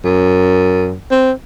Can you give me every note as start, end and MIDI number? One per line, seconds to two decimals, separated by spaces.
0.04 0.95 42
1.11 1.31 60